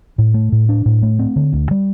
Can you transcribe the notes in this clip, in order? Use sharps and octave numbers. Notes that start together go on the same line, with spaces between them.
A2
A3
A2
D4
A2
A3
C4
D3
D2
G3